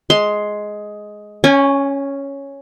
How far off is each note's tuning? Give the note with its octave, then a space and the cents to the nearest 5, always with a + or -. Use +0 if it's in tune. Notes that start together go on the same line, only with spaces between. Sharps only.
G#3 +10 C6 +0
C#4 +0 G#5 -35